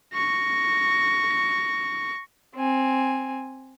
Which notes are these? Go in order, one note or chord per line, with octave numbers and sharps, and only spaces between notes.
C#6 A#6
C4 G#5